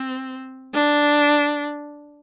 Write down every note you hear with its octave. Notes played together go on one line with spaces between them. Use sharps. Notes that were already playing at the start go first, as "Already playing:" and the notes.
Already playing: C4
D4